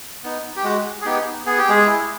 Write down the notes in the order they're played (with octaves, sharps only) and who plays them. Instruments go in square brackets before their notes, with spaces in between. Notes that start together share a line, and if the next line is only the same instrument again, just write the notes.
[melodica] B3 D#4
G4
G#3 F#4
G#4
B3 D#4 G4
B3 G#4
G4
G#3 G#4
E4